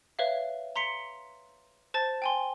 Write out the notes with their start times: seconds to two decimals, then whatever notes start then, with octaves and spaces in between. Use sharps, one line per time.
0.19 B4 C#5 E5 F5
0.76 A#5 C6 B6 C#7
1.94 C5 A5 A6
2.22 G5 G#5 C6